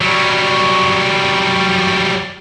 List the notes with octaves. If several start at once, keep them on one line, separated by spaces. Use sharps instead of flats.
F#3 G3